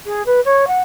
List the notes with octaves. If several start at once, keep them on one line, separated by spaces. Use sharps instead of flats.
G#4
B4
C#5
F#5